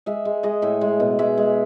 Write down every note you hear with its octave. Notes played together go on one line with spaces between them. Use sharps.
G#3 E5
G#3
G#3 D#5
A2 E5
G#3
B2
G#3 E5
G#3